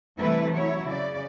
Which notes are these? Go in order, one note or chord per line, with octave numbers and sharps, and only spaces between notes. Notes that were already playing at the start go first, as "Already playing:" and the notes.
C3 E3 G3 A3 E4 B4
F#3 E4 C#5
C#3 D5